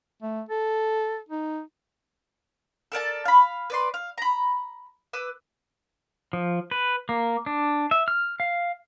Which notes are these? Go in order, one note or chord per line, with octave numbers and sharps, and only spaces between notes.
A3
A4
D#4
A4 A#4 D5 A5
F5 B5
B4 D5 C6
F5
A#5 B5
B4 D6 E6
F3
B4
A#3
D4
E5
F6
F5